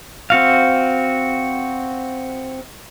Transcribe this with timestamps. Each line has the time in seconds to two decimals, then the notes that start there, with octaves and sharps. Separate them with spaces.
0.30 C4 F#4 F5